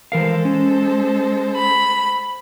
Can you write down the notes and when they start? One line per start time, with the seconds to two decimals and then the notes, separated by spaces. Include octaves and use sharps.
0.12 E3 G#3 A4 A#4 C5 F5
0.45 C#4
1.56 B5